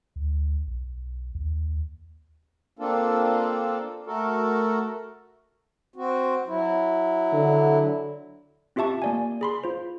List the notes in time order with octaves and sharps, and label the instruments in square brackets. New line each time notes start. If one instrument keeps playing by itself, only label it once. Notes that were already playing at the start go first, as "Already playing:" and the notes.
[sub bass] D2
B1
D#2
[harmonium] A#3 C4 D4 F4 A4
A3 F#4 A4 A#4
C4 F#4
F#3 E4
[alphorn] D3
[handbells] C4 F4 G4 E5 A5 C#6
A#3 D5 G#5
G#4 B5 C6
F4 C5